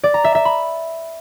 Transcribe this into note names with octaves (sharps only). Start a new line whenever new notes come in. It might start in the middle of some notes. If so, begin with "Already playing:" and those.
D5
A#5
E5
E5
B5